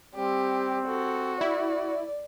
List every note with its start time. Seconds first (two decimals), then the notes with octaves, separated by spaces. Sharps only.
0.16 G3 C4 G4
0.87 F#4 A4
1.41 E4 D5